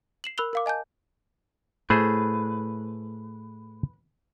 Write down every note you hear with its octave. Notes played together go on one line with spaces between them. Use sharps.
C7 E7 F#7
A#4 B5 E6 F#6 F7 G7
A#4 F5 D6
D#5 G#5 A5 G6
A2 A3 G#4 B4 C5